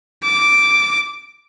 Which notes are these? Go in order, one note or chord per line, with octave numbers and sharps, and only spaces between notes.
D6